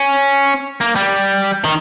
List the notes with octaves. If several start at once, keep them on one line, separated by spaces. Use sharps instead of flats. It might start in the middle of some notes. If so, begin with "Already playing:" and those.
Already playing: C#4
A#3
G3
D#3